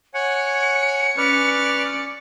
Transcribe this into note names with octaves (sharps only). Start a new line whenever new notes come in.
C#5 F#5 G#5 C#7
C#4 B4 D5 F6